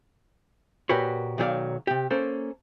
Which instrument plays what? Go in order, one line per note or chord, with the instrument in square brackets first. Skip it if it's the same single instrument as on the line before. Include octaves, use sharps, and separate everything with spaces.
[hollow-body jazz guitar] A#2 F#4 G4 A#4 B4 C#5
B1 D#3 F#3 G4 D5 F5
C3 G4
A#3 C#4 A4 C5